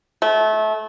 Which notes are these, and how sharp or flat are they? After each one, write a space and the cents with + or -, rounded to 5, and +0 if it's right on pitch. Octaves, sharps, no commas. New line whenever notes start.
A3 -25